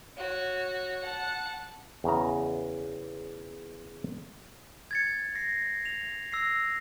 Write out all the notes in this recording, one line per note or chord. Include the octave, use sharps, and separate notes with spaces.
F#4 C#5
F#5 A5
E2 C#3 A#5
G#6 A6 C#7
A#6 C7
F7
E6 A#6 C7